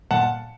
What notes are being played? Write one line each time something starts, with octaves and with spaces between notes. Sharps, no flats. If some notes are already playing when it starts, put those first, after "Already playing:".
A#2 F#5 A5